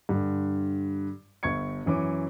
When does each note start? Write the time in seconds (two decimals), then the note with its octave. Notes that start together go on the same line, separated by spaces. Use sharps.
0.09 G2 D3
1.43 G1 C#6 G#6 C#7
1.86 F#2 E3 C#4 D6